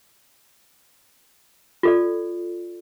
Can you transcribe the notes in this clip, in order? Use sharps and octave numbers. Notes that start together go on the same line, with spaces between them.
F4 A4 D5